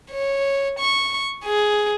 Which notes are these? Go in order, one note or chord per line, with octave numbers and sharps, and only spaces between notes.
C#5
C#6
G#4